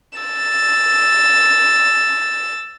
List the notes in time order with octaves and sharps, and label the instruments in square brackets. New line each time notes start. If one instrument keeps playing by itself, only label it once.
[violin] E6 A6